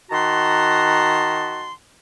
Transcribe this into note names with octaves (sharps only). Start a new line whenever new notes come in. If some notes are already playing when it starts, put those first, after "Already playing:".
D#3 F#4 F#5 A5 A#5 C6